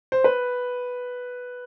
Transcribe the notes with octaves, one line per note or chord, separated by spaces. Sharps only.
C5
B4